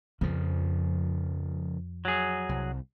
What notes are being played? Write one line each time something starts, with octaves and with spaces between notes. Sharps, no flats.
F2 C#3 F3
F#3 G#4
C2